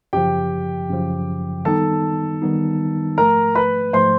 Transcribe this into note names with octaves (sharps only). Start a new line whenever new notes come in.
F#2 C#3 F3 G4 G5
F#2 C#3 F3
D#3 G3 B3 D#4 A4 A5
D#3 G3 B3 D#4
G#2 F3 A3 A#4 A#5
B4 B5
G#2 F3 A3 C5 C6